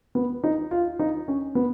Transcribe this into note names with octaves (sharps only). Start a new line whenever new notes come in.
B3
D#4
F4
D#4
C#4
B3